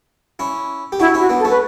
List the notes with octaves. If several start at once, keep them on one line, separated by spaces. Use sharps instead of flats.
C#4 E4
G4
D4 E4 F#4
C#4 E4
F#4
B3 D4
A4
A3 C#4
B4